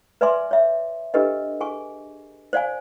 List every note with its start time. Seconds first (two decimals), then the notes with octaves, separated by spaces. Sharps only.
0.21 B4 D5 E5 G#5 C6 D6
0.51 C#5 E5
1.14 D4 G4 A4 B4 D#5
1.61 G#4 G#5 C#6
2.53 C5 D5 F5 G#5